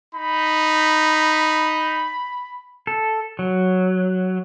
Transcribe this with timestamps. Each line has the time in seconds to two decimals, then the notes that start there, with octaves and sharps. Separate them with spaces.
0.15 D#4 B5
2.87 A4
3.39 F#3